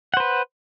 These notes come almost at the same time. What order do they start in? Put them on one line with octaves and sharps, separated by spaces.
F#5 C5 B4